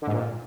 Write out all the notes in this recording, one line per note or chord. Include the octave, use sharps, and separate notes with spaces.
D3
G#2
A#2